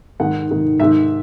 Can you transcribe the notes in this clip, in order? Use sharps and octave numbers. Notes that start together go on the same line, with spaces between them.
G#2 D#3 F#5
G#2 D#3
G#2 D#3 E5